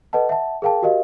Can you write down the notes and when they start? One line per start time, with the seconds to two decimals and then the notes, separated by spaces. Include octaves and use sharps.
0.13 A4 B4 D#5 F#5 A5
0.29 E5 F#5 A5
0.62 G#4 A#4 F5 G5 A5
0.82 F#4 G4 A#4 D#5 F5